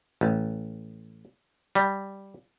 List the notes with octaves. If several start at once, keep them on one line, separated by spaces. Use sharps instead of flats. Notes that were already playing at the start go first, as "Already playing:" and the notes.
A1
G3